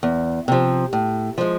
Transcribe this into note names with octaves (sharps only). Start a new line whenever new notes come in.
E2
C3 F3
A2
F3 G#3